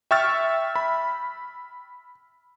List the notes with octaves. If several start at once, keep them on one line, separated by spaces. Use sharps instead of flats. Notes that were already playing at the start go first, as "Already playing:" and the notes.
E5 G5 C#6 E6 F6 A6
B5